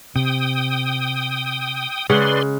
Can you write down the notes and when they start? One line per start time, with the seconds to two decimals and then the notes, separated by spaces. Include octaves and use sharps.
0.16 C3 G5 D#6
2.10 C#3 G#3 B4 D5 F#5 C6